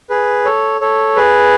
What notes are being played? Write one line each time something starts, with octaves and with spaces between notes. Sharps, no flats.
G#4 B4
A4 C#5
A4 C#5
G#4 B4